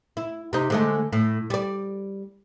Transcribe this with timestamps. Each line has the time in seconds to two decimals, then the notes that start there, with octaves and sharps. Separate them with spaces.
0.17 E4
0.53 C3 D#4
0.70 D3 G#3 A3
1.13 A2
1.50 G3 D5